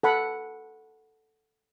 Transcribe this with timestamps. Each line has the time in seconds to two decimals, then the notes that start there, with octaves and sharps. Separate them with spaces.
0.03 A4 F#5 B5